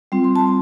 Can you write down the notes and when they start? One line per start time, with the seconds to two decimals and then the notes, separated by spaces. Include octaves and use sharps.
0.12 G3 C4 F4
0.24 C6
0.36 A5